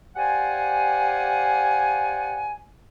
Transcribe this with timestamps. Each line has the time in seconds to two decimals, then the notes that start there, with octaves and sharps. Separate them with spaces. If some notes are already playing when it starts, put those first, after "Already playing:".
0.16 G4 C5 D5 F5 F#5 G#5